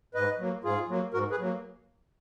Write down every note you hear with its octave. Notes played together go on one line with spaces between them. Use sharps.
G#2 B4 D#5
F#3 A#3
G#2 F4 G#4
F#3 A#3
G#2 F#4 A#4
G#4 B4
F#3 A#3